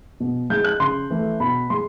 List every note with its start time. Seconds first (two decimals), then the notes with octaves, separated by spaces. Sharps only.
0.20 B2
0.50 G#3 G6
0.64 F#6
0.80 C#3 C6
1.10 E3 A3
1.40 B2 B5
1.70 G#3 C6